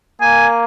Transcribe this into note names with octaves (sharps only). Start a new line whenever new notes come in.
A#3 G#5